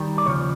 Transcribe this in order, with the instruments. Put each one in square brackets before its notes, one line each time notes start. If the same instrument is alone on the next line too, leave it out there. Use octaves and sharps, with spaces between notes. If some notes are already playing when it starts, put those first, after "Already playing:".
Already playing: [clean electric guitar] D#3 G3
D5
D#2 C#3 F3 C#5